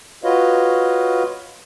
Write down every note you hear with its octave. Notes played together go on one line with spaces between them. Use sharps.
F4 F#4 B4 C#5 D#5 F5